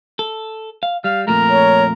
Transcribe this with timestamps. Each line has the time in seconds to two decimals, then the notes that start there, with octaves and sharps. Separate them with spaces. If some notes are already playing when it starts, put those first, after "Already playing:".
0.19 A4
0.83 F5
1.04 G3 F5
1.28 F2 A#2 A3 A#4
1.50 C#5